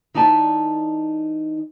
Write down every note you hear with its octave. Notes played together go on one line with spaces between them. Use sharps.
E3 D#4 D5 E5 A5